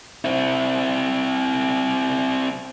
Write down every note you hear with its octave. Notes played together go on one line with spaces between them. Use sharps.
C4 E4